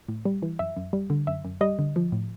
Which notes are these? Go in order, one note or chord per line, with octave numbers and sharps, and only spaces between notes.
A2
G3
E3
F#2 E5
F#2
G3
D3
F#2 E5
F#2
G3 D#5
D3
F3
A2